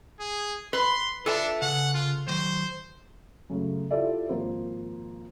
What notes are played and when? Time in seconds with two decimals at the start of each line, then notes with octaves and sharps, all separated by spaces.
0.20 G#4
0.73 B4 C6
1.26 D4 F4 A4 E5 A5
1.62 C#3 F#5
1.94 F4
2.28 D#3 F#3 C5
3.50 F#2 C#3 A3
3.90 E4 F4 G4 A4 D5 E5
4.29 G#1 F3 A#3 C5